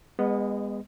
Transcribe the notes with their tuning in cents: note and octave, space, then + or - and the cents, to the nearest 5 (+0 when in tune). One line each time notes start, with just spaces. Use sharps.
G#3 -30 B3 +0 D#5 +0